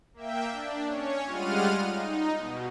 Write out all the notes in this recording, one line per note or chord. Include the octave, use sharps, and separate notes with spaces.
A#3 E5 G5
D4
C#4 C#5
G3 G#3 F4 F#5 F6 D#7
D#4
B2